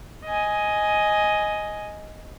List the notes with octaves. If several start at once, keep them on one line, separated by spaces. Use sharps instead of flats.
D#5 G#5